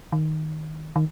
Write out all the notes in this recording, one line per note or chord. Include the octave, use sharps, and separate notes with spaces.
D#3
D#3